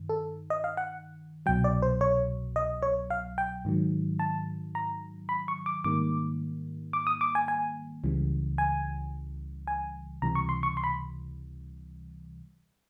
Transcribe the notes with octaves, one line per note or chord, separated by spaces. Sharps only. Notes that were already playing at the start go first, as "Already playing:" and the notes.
Already playing: G2 D#3
A4
D#5
F5
F#5
C2 B2 F#3 G5
D5
C5
C#5
D#5
C#5
F5
G5
G#2 D#3 F#3
A5
A#5
B5
C#6
D6
G#2 D#3 G3 A#3 D6
D6
D#6
D6
G#5
G#5
C#2 C#3 E3 G3
G#5
G#5
C#2 C3 E3 G3 A#5
C#6
C6
C#6
C6
B5